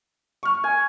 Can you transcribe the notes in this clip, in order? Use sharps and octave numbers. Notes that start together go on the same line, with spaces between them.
C#6 F6
G#5